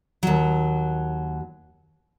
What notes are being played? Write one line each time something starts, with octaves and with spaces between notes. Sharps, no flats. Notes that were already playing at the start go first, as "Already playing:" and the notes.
D#2 F#3